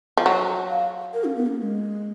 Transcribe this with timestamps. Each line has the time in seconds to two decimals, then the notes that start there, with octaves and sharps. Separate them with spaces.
0.17 F3
0.26 F#3 F#5
0.70 F5
1.14 A#4
1.24 C#4
1.36 B3
1.46 A#3
1.57 A#3
1.62 G#3